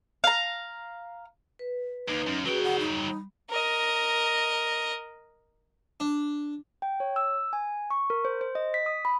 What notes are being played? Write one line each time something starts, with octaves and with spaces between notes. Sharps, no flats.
F5 A#5
B4
D#2 D#4
F#2 C#4
F#3 F#4 G#4 B4 G5
F#5
G3 D#4 B5
A#4 D#5
D4
G5
C#5
E6
G#5
C#6
A#4
C5
C5
D#5
B6
D#6
B5